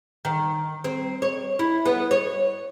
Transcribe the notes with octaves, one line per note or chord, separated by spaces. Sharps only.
D#3
C4
C#5
E4
B3
C#5